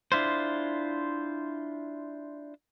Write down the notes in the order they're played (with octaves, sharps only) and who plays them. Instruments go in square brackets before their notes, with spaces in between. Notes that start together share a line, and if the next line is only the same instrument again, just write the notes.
[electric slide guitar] D4 E4 F4 C5